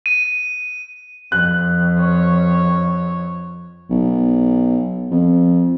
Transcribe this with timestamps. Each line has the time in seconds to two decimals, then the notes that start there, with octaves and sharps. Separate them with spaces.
0.06 D#7
1.32 F2 F#6
1.99 C#5
3.90 B1
5.11 F2